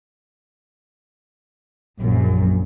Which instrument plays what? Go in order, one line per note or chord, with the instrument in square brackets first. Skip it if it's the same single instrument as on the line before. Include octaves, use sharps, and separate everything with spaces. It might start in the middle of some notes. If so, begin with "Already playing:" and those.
[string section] A#1 F#2